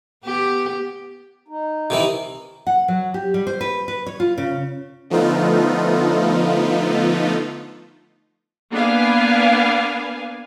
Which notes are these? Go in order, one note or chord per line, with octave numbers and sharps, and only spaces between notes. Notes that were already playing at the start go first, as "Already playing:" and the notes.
B3 G4
D#4
C3 D#3 E3
F#5
F#3
G4
G3
C5
B4
B4
C#5
F4
C#3
D3 F3 A3 B3 D#4 F4
A#3 B3 D4 B4 F5 G#5